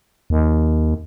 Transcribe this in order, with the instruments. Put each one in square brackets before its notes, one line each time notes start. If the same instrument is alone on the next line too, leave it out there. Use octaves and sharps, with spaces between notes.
[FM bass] D#2